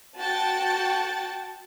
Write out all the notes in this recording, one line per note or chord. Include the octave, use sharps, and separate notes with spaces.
F#4 G5 A5 A6